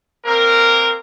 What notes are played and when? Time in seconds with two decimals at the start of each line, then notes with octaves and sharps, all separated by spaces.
0.25 A#3 C4 A#4